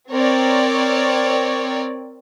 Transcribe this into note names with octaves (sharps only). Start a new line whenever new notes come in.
C4 A#4 C#5 D5